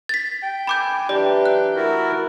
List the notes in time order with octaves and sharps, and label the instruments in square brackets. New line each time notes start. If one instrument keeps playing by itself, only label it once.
[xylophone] A6 B6
[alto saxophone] G5
[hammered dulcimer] D4 A4 [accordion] G#5 [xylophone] B5 D6 G6
[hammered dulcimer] E3 F#3 A#4 [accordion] D4 [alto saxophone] G4 [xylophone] D5
[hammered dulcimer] E5 [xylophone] F#6
[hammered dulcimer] A3 A5 B5 [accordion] E4 F#4 A#4